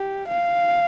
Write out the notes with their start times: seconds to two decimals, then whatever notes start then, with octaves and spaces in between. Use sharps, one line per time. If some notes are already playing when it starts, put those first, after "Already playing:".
Already playing: G4
0.28 F5